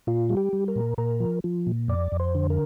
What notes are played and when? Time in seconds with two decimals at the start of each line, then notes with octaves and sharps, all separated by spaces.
0.07 A#2 F4
0.29 G3
0.37 G4
0.53 G3
0.68 A#4
0.76 A#2
0.98 A#2 A#4
1.20 F3
1.44 F3
1.67 A#2
1.88 F2 D5
2.12 F2
2.20 C5
2.35 D3
2.50 A#4